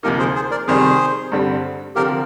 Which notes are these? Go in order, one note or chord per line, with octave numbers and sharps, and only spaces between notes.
D2 C3 F3 A#3 D#4 G4 A#4
G#4 C5
G#4 C5
A#4 D5
F2 C3 D#3 G3 G#4 C5
G2 D3 G3 C4
D3 F3 C4 F4 G4 A#4